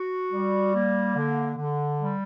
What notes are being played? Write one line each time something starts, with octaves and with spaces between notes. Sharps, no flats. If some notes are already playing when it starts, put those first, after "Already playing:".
Already playing: F#4
G3
A#3
D3
D3
G3